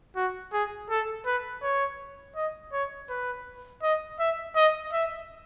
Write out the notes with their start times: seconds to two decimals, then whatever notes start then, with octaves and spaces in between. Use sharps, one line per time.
0.16 F#4
0.53 G#4
0.90 A4
1.26 B4
1.63 C#5
2.36 D#5
2.73 C#5
3.09 B4
3.83 D#5
4.19 E5
4.56 D#5
4.93 E5